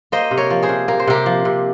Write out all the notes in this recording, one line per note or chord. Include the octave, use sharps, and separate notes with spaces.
A#3 C5 D#5
C3
A#4 C#5
F3
G#4 C5
C3
A#3 A#4
C5
C3 G4 A#4
F3
C3